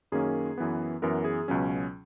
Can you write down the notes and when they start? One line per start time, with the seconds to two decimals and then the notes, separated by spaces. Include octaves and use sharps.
0.12 F#2 D#3 A#3 C#4 G#4
0.58 F#2 E3 B3
1.02 F#2 E3 B3 A#4
1.25 G#4
1.48 C#2 B2 F#3 C#4